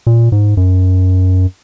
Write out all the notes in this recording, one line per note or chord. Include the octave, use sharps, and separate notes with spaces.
A#2
G#2
F#2